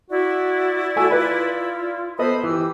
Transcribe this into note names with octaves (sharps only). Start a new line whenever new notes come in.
E4 F#4 D5
A3 F#4 G#5 E6
F4 B4 B5
B3 A4 C5 D#5 B5 D#6
E3 G4 E6